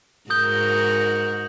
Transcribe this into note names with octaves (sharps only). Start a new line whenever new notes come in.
G#2 F#4 A#4 D#6 G6 G7